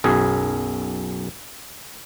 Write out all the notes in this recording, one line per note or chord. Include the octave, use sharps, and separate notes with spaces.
B1 F#2 G#4